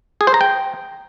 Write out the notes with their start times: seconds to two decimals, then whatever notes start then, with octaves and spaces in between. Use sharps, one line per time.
0.21 G#4
0.27 C5
0.34 A#5
0.41 G5